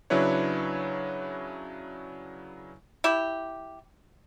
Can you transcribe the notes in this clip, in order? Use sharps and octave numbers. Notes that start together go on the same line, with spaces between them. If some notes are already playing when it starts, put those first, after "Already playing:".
C#3 F#3 D4 E4 B4 C#5
E4 G4